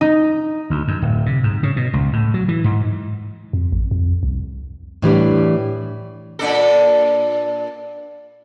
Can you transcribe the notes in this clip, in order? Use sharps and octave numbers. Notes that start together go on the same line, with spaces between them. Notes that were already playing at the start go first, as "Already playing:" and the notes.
D#4
D2
F#2
D1
C3
G#2
C#3
B2
C#2
A2
F#3
E3
G#2
F2
A1
F2
C2
A2 E3 G3 D4
A#2 D4 A4